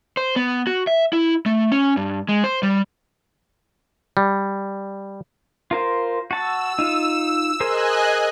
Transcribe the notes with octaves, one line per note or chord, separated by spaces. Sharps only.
C5
B3
F#4
E5
E4
A3
C#4
G2
G#3
C5
G3
G3
F4 A#4 C5
F#4 A5 E6
D#4 F4
G#4 A#4 C5 D#5 G#5 F#6